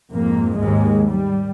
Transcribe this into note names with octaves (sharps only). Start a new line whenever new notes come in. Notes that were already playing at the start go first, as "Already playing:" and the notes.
F2 G#2 A#3
D#2 G#2 G#3
G3